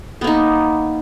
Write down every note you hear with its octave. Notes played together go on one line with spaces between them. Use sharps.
A#3 B3 D#4